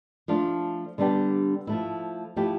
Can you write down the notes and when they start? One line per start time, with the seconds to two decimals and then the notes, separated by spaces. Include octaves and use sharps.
0.28 F3 A3 D4 F4
0.98 D3 G3 B3 D4 G4
1.67 F3 A3 E4
2.36 F3 A3 E4 G4